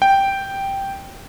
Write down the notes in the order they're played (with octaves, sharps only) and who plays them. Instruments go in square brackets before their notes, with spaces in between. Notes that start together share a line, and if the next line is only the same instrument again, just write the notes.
[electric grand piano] G5